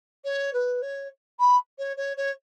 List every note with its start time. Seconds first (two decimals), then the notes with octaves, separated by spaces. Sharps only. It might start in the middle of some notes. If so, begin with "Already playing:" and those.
0.24 C#5
0.53 B4
0.82 C#5
1.39 B5
1.78 C#5
1.97 C#5
2.17 C#5